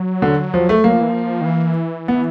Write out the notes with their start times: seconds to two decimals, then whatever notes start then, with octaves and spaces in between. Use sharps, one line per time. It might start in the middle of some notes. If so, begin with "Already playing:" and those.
Already playing: F#3
0.22 D3
0.54 F3
0.69 A3
0.84 F#3 A#3
0.93 F3
1.01 E3
1.09 F3
1.41 D#3
1.46 E3
2.08 B3